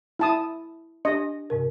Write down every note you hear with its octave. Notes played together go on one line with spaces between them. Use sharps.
E4 A5 D#6
D4 G4 D#5
G#2 C3 A#4